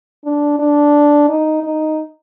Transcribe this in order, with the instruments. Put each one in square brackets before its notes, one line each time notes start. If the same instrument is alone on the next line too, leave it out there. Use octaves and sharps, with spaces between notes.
[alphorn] D4
D4
D#4
D#4